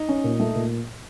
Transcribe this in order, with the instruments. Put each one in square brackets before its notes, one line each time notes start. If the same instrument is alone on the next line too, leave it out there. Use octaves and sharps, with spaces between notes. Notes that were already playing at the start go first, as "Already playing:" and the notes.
Already playing: [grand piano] D#4
[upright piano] C#4
A#2
A3
A#2